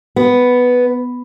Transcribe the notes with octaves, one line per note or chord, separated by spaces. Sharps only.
B3